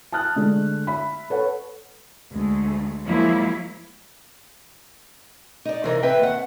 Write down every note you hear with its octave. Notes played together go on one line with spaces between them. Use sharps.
A5 D#6 F6 F#6
D3 G#3 A3
E5 B5
A4 B4 C#5 F#5
D2 G#3 A3
F3 F#3 G#3 A#3 E4
D#4 D5
C3 E3 A#4
C4 B4 E5 G5
D#2 F#5